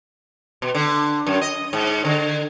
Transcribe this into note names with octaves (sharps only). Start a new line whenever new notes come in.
B2
D3
F#2
D#5
G#2
D3